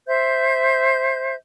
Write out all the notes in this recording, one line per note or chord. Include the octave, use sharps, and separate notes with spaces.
C5 E5 G6